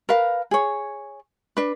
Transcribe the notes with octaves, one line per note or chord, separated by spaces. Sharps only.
A#4 B4 F5
G#4 C#5
D4 B4